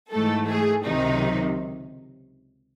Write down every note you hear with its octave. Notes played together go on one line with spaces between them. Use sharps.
G#2 E3 A3 A4
G#4
C#2 C3 D#3 F#3 D#4